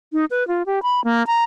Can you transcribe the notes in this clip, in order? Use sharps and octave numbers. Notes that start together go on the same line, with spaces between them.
D#4
B4
F4
G4
B5
A#3
A#5